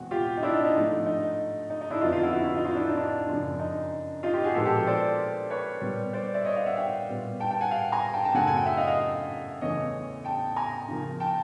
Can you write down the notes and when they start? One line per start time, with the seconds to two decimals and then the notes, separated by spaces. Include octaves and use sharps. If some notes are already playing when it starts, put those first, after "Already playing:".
Already playing: E2 B2 G#3 C4 F#4
0.11 F4 G4
0.37 D#4
0.43 D4 E4
0.53 D#4
0.64 D#4
0.75 G#2 F3 A3
1.06 D#4
1.70 D#4
1.81 D#4
1.90 D4 E4
2.01 F2 D3 F#3 B3 D#4 F4
2.12 D#4 F4
2.23 E4 F#4
2.33 E4 F#4
2.44 E4 F#4
2.54 D#4 F4
2.65 D#4 F4
2.75 D4 E4
2.87 D#4
2.97 D4
3.29 F#2 C#3 F3
3.59 D#4
4.23 D#4 F4
4.33 F4 G4
4.44 F#4 G#4
4.54 A#2 F3 G#3 B3 G4 A4
4.65 G4 A4
4.76 G4 A4
4.87 C5 D5
5.50 B4 C#5
5.81 A#2 G3 B3
6.13 C5 D5
6.34 D5 E5
6.45 C#5 D#5
6.55 D#5 F5
6.66 E5 F#5
6.76 F5 G5
7.09 A#2 G3 B3
7.40 G5 A5
7.51 G5 A5
7.61 F#5 G#5
7.71 F5 G5
7.92 G#5 A#5
8.13 G5 A5
8.25 G5 A5
8.34 F#2 C#3 F#3 A3 F#5 G#5
8.47 G#5
8.57 G5
8.66 E5 F#5
8.77 D#5 F5
8.88 D#5 F5
9.61 E2 C#3 E3 A3 C#5 D#5
10.24 G5 A5
10.56 G#5 A#5
10.89 C#3 F3 A#3
11.20 G5 A5